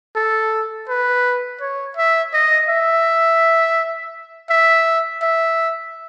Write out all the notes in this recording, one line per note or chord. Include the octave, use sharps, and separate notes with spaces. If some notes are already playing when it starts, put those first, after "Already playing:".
A4
B4
C#5
E5
D#5
E5
E5
E5